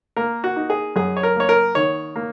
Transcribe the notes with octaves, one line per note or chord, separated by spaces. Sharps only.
A#3 A#4
F#4
D#4
G#4
F#2 G#4
C#5
A#4
A#3 C#5
A#4
D#3 C#5
A#3